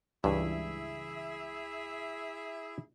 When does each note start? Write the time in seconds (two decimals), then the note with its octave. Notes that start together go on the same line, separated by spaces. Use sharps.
0.24 C#2 G2 E3 E4 G#4 E5